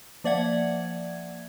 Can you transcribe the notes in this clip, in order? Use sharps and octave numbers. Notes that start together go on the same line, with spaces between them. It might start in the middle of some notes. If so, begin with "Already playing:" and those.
F3 A#3 D5 E5 F#5 G#6